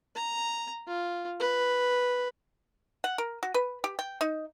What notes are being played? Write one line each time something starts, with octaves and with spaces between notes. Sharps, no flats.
A#5
F4
B4
F#5
A#4
F#4
B4
G4
G5
D#4